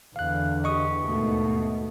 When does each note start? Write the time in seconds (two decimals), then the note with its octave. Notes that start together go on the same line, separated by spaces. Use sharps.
0.16 E2 D3 F5 F#6
0.64 G4 D#5 C#6 D#6
1.01 D#2 G#2 B2 A3